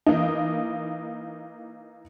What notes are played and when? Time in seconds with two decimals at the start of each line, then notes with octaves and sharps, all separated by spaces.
0.06 E3 A#3 D#4